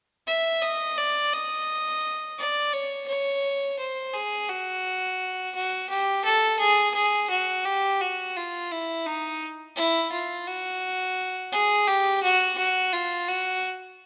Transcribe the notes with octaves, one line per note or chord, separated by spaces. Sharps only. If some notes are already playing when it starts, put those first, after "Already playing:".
E5
D#5
D5
D#5
D5
C#5
C#5
C5
G#4
F#4
F#4
G4
A4
G#4
G#4
F#4
G4
F#4
F4
E4
D#4
E4
F4
F#4
G#4
G4
F#4
F#4
F4
F#4